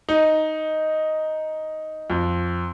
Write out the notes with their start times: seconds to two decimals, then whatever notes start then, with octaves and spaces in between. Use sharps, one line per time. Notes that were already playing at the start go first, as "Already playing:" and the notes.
0.09 D#4
2.10 F2